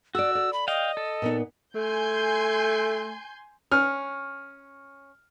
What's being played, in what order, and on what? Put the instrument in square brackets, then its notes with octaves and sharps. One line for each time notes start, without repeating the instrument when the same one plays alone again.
[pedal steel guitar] F#4 [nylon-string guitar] A4 D5 [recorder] E6
[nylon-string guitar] D5
[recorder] B5
[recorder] D#5 [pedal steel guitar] F5 G5
[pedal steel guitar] A4
[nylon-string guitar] A#2 B3 D#4
[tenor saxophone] A3 [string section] G#5 C6 G6
[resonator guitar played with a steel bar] C#4 [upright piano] F6